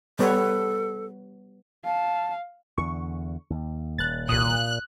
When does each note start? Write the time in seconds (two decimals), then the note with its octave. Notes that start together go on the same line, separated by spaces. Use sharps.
0.19 G3 B3 A4 C#5
1.85 F5 A5
2.78 E2 D3 C#6
3.50 D#2
3.98 D#1 F#6 A6
4.29 C2 A#2 D#6 F#6